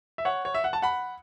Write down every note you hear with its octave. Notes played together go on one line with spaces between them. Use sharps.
E5
C#5 F#5
C#5
E5
F#5
A5
F#5 B5